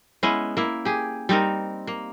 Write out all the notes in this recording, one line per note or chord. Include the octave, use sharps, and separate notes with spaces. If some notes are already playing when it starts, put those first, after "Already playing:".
G#3 B3 C#4 E4
A#3 E4
G4 G#4
G3 C4 D#4 A#4
A#3